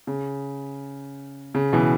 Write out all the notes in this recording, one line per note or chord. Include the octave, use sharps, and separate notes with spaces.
C#3
C#3
B2 E3